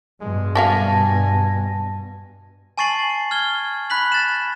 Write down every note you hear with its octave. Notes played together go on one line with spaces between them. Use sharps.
G2 B2 G#3
F#4 E5 F5 G#5 A5 A#6
G#5 A5 C#6 A6 C7 F#7
F6 G#6 G7
B5 F#6 B6 F#7
A6 E7